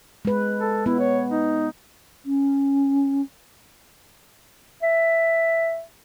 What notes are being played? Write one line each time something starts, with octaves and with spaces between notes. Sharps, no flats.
G#3 B4
A4
B3 E4
C#5
D#4
C#4
E5